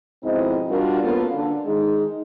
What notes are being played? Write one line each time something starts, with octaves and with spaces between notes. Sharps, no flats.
F2 G#2 B2 C4 E4 D#5
G3 D4 F4 F#4 A#4
A#3 B3 C#4 F4 A4
D3
D#3 G#3 D#4